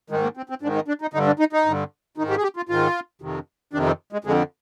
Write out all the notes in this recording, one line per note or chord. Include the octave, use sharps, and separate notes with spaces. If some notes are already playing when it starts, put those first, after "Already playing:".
G#2 D#3 G#3
A#3
C4
C4
G#2 D#3 D4
D#4
D4
D#4
G2 D3 D#4
D4
D#4
D#4
G2 D3
G#2 D#3 D#4
G4
G#4
G4
F4
G#2 D#3 F4
F2 C3 D#3
F2 C3 D#3 D4
C4
G#3
F2 D3 G#3